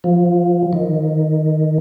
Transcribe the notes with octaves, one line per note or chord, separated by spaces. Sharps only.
F3
D#3